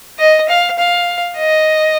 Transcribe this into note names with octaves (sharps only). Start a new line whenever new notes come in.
D#5
F5
F5
D#5